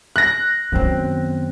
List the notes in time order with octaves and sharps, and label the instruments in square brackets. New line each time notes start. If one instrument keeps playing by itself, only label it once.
[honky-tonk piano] F#6 A#6
[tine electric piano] F#2 F#3 C4 [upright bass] D#3 B3